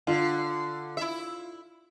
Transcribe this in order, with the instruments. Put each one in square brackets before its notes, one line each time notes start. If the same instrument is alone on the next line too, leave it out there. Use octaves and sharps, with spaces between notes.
[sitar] D3 [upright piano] F4
[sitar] E4 E5